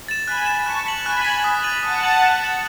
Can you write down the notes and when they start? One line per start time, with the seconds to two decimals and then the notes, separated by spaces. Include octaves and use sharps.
0.08 A6 E7
0.27 G#5 B5 F#6
0.46 A6 E7
0.66 A5 C#6 F#6
0.86 B6 F#7
1.05 G#5 B5 F#6
1.25 B6 F#7
1.44 D#6
1.64 A6 D#7 F#7
1.83 F#5 A5 D#6
2.04 A6 D#7 F#7
2.23 F#6
2.41 A6 C#7 E7